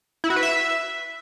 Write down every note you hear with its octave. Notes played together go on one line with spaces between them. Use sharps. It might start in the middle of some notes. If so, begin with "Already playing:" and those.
E4
F#4
B4
E5